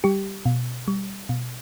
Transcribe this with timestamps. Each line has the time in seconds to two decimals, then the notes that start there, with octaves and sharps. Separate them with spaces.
0.04 G3 G4
0.46 B2
0.88 G3
1.29 B2